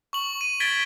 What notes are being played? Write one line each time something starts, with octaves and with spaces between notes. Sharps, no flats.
C#6 F#7
D#7
G#6 A6 B6 D7 G7